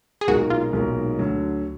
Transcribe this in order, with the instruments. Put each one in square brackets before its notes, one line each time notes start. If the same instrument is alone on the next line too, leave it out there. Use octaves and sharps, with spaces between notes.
[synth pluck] G#4
[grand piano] B1 A#2 G#3 D#4 A#4 [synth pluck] F#4
[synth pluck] F4
[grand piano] B1 A#2 G#3 D#4 A#4
D2 D3 F#3